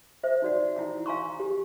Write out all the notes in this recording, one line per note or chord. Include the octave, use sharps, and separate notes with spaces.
C5 E5
D#4 F#4 D5 F#5
D#4 E4 F#5 G5
F5 G5 G#5 A#5 C6 C#6
G4